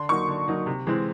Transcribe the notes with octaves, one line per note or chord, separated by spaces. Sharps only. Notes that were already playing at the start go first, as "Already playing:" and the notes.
Already playing: D3 C6
F#3 A#3 D#4 C#6
D3
F#3 A#3 D#4
C3
E3 G#3 C4